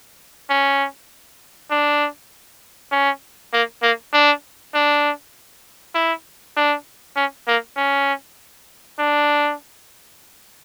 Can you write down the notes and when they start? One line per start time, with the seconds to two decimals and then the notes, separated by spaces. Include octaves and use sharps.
0.50 C#4
1.71 D4
2.92 C#4
3.53 A#3
3.83 A#3
4.13 D4
4.74 D4
5.95 E4
6.57 D4
7.16 C#4
7.48 A#3
7.77 C#4
8.99 D4